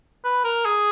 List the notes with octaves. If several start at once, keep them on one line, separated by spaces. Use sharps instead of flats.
B4
A#4
G#4